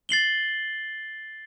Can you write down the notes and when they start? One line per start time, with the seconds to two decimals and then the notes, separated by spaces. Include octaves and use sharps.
0.09 A6 C7 F#7 G7